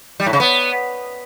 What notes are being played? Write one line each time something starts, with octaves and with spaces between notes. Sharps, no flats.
G3
A2
C#3
B3